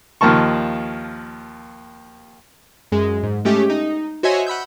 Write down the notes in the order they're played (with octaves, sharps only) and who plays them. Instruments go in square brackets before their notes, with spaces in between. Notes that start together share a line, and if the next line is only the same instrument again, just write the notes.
[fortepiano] D#2 F3 A#3 A5 C#6
[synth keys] F#2 G#3
G#2
G#3 A3 C#4 G4
D#4
F#4 C5 C#5 D#5 E5 G#5
F#5 B5 E6 G6